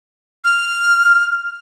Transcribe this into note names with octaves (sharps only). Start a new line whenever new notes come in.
F6